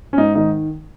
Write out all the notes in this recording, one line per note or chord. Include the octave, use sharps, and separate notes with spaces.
C#4
G#2 D#4
D#3 D#4